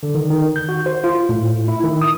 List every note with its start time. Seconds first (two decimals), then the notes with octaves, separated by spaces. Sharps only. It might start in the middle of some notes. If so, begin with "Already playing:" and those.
0.03 D3
0.15 D#3
0.30 D#3
0.56 G6
0.69 F#4
0.86 C5
1.04 F4
1.29 A2
1.68 E4
1.84 D#3
2.02 D#6